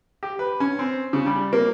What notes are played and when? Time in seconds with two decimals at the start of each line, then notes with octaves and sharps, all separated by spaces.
0.23 G4
0.39 B4
0.60 C#4
0.79 C4
1.13 C#3
1.26 G3
1.53 A#3